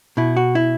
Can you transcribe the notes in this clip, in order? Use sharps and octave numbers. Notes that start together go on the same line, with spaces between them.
B2 E4
F#4
E4